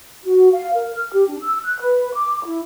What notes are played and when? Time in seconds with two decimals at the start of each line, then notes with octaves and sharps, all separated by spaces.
0.25 F#4
0.52 F5
0.74 A#4
0.96 F6
1.13 G4
1.29 D4
1.42 E6
1.65 F#6
1.80 B4
2.14 D6
2.45 E4